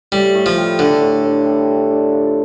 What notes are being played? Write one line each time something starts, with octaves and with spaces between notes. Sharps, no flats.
A2 G3
A2
F3
G3
D3 D4
A2
A2
G3
G3
D4
F4